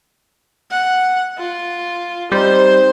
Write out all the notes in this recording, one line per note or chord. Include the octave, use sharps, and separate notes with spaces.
F#5
F4
G3 C4 D#4 C5